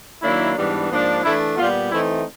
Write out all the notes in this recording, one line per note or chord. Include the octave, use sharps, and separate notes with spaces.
D#3 F#3 A#3 D4 E4
G#2 E3 G3 B3 D4
G#2 F3 A#3 D4
E3 A3 D4 E4
A#2 G3 B3 F4
E3 A3 C4 D#4 E4